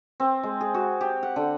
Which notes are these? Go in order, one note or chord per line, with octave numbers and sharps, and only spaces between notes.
C4
G#3
G#4
F#4
G4
F#5
D3